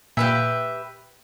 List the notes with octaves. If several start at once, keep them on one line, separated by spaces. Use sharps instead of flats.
A#2 G4 B4 E5